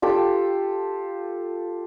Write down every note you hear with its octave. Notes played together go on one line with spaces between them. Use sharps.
F4 G4 A4 G5